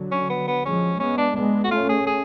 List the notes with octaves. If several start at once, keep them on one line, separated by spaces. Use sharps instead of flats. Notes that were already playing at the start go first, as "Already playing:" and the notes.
Already playing: D3 F#3
C#4
B3
B3
F3 G#3 C#4
G#3 B3 C#4
D4
G#3 B3 D4
F#4
A3 C#4 F4
G#4
G#4